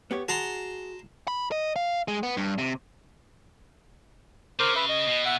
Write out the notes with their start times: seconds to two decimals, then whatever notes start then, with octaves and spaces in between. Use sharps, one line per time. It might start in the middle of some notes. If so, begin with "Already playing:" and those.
0.11 B3 G4 C#5
0.29 F#4 G#4 A5 A#5 C6
1.28 B5
1.52 D#5
1.76 F5
2.08 G#3
2.23 B3
2.37 G2
2.58 C3
4.59 C#3 A#4 C5 D6
4.76 B4 E5
4.89 D#5
5.08 B2
5.26 E5 F#5